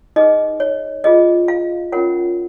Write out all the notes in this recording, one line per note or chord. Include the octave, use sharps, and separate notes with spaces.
D#4 G#4 B4 D#5
C#5
F4 G#4 B4 D#5
F5
C#4 F4 A#4 C#5 F#5